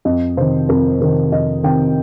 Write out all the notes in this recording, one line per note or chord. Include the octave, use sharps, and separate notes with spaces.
F2 D#5
C3 D#3 C5
F2 A#4
C3 D#3 A#4
F2 D#5
C3 D#3 G5